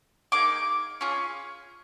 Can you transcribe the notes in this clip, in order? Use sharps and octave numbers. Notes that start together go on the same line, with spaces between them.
A#3 D#4 G#4 D6
C#4 F4 G#4